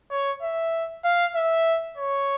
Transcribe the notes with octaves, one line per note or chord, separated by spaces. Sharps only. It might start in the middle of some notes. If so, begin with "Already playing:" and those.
C#5
E5
F5
E5
C#5